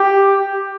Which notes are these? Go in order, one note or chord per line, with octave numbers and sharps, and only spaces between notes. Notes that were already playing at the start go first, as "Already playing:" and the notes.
Already playing: G4